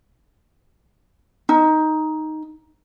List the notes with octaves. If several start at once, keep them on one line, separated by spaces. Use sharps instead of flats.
D#4